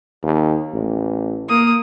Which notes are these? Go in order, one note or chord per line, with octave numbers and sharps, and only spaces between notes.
D#2
A1
A#3 D#6